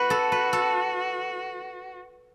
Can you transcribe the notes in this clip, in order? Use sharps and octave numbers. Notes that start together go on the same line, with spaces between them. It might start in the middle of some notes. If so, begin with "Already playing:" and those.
Already playing: F#4 B4
A4
B4
A4